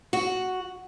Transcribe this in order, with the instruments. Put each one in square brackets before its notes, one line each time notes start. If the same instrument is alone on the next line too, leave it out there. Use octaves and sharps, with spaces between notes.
[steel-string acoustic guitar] F#4